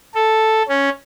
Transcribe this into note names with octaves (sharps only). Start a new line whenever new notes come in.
A4
C#4